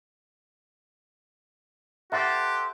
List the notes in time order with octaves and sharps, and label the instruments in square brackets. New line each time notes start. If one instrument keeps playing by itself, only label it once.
[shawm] G4 [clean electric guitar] A4 C5 [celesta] E5 F#5 [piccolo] F#6